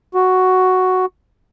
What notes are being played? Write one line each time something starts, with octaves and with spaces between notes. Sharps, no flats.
F#4